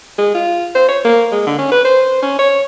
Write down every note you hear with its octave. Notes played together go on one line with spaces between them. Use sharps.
G#3
F4
C5
C#5
A#3
G#3
D3
C#4
B4
C5
C#4
C#5